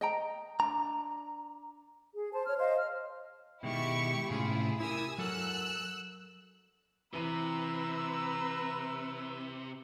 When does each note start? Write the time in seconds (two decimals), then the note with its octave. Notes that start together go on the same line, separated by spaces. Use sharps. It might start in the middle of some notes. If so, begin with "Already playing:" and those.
0.01 D#5 G5 A#5
0.60 D4 A#5
2.14 G#4
2.33 C5 A5
2.46 C#5 F6
2.58 C5 D#5 F5
2.76 F6
3.63 B2 D#3 G#3 E4 G4 C#6
4.30 A2 C3 C#4 E4 F4 G#4
4.80 E4 G4 A#4 G#5 D#6 E6
5.18 F#3 A4 A#4 E6 F#6
7.13 C3 E3 B4 A#5 E6 D#7